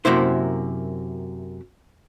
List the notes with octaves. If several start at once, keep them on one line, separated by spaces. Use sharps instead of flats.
F#2 C3 A#3 E4 C5